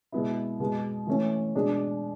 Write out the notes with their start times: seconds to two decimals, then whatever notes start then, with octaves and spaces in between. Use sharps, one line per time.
0.12 B2 G#3 B3 E4
0.60 B2 G#3 B3
1.07 E3 A3 C#4
1.55 B2 G#3 D4 G#4